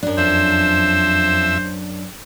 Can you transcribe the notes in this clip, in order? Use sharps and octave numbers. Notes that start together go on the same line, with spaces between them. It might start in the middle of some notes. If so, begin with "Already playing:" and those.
F#2 D4
F2 C5 E5